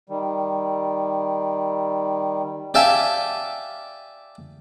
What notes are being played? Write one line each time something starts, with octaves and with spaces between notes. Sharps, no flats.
D#3 G3
G4 D5 E5 F5 G#5 A5